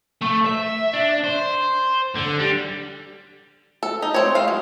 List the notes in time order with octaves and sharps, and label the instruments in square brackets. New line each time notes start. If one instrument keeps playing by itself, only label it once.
[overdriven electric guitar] A3
E5
D4
C5
D3
G3
[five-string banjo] A4
D#4
C4 C#5
G#3 F5
F#3